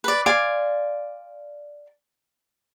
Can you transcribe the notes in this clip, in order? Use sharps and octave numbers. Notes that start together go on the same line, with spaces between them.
B4 D5
D5 F5 G#5 C6